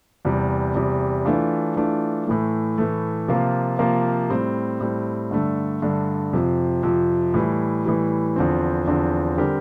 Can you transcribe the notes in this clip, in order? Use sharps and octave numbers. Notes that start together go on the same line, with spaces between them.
E2 C3 G3
E2 C3 G3
E3 A3 D4 F4
E3 A3 D4 F4
A2 E3 A3
A2 E3 A3
C3 F3 A#3 F4
C3 F3 A#3 F4
A2 G3 C4
A2 G3 C4
G2 D3 A3
G2 D3 A3
F2 C3 F3
F2 C3 F3
A2 E3 G3
A2 E3 G3
E2 D3 F3 C4
E2 D3 F3 C4
D3 G3 C4 G4 A#4